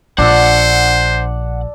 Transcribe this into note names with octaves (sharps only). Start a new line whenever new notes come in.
A#1 D4 C5 F#5 E6